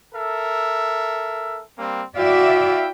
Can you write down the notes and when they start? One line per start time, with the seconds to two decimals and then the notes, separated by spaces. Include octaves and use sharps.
0.15 A4 A#4 E5
1.78 G3 A#3 C4
2.17 E4 F#4 D5 E5 F5 G5